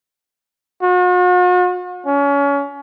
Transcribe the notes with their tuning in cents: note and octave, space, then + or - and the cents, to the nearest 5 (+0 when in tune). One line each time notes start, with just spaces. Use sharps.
F#4 -45
C#4 +30